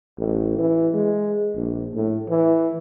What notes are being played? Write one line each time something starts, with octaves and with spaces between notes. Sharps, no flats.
A1
E3
G#3
A#1
A2
E3